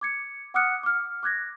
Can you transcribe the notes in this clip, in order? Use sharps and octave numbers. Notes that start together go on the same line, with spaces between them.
D6 G#6 C#7
F#5 D6 D#6 F6 F#6 C#7
D6 F6
D6 F#6 G#6 A#6